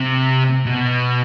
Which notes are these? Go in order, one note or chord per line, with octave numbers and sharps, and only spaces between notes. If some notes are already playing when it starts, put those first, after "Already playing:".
Already playing: C3
B2